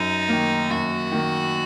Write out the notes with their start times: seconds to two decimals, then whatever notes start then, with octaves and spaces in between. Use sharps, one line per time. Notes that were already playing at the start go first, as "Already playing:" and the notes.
Already playing: F#2 D#4
0.29 D#3 A#3
0.70 F#2 F#4
1.12 D#3 A#3